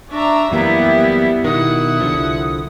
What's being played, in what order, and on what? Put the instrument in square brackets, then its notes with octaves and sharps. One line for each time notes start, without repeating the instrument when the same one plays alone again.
[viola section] D4 E5 A#5 [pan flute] C#6
[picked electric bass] F#2 E3 A#3 [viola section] G3 B3 E4 [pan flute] E5
[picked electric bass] B2 D#3 [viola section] E4 F#5 [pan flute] D#6
[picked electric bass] C2 D3 F3